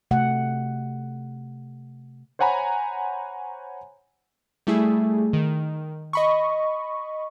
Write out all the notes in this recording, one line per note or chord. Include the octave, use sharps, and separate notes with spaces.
C3 A3 F#5
C5 C#5 F#5 G#5 A#5 B5
G3 A3 E4 G#4
D#3
D#5 B5 C#6